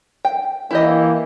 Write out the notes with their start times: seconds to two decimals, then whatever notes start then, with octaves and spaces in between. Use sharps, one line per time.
0.25 G5
0.71 E3 A#3 E4 G4 D#5